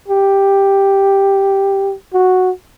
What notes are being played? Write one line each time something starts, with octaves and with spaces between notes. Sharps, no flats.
G4
F#4